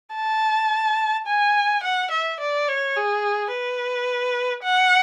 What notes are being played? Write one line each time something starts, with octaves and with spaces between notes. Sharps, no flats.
A5
G#5
F#5
E5
D5
C#5
G#4
B4
F#5